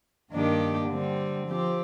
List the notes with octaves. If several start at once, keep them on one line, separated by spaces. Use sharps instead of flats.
G2 D#3 A#3 D4 G4
D3 G3 C4
F3 C4 G4